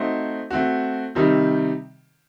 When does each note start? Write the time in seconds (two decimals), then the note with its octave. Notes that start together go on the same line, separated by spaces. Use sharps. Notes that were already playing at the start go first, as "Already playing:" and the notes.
Already playing: A3 C4 D#4 F#4 C5
0.51 A3 C4 F#4
1.15 C3 D#3 G3 C4 D#4